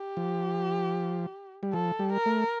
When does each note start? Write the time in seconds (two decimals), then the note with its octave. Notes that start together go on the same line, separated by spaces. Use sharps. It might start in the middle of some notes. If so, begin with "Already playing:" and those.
Already playing: G4
0.17 F3
1.63 G3
1.73 F3 A4
1.99 G3
2.13 A#4
2.26 A3